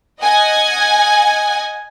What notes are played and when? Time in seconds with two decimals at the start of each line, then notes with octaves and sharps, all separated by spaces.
0.21 D#5 F#5 G#5